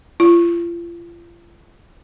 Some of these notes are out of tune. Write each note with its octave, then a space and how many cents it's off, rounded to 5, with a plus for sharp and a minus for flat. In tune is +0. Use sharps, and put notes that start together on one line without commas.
F4 -35